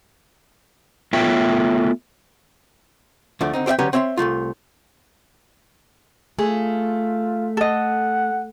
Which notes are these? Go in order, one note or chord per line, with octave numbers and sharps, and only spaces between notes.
A3 B3 F4 C#5 E5 G5
D2 F3 A3 D4
D3 C4 D#4
C4 G4 D5 E5 G5
D3 F#3 C#4 G4 B4 C#5
C4 C#5 E5 B5 C6
C2 E3 A3 F4
A3 F4 G#4
A4 D#5 F#5